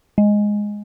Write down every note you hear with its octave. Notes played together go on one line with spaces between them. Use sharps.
G#3